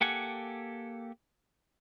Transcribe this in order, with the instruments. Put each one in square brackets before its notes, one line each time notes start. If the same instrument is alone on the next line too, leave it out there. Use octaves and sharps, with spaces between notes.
[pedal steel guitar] A#3 G4 A4 F#5 G#5